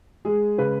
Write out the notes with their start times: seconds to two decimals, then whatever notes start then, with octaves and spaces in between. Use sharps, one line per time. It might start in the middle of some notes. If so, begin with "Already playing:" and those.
0.25 G#3 G#4
0.58 C#3 B4